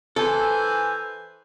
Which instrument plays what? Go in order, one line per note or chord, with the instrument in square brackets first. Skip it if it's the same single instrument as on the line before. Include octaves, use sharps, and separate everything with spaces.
[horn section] E3 C5 G#5 [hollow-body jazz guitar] A4